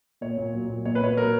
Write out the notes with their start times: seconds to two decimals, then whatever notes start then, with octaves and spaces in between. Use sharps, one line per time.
0.21 A#2 C#5
0.37 A#2
0.53 F#3
0.69 A#2
0.85 A#2 C#5
0.95 B4
1.02 A#2 C#5
1.17 F#3 A#4